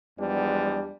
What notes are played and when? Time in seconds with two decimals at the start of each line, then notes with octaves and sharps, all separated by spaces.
0.19 E2 F3 G3 G#3 B3 D4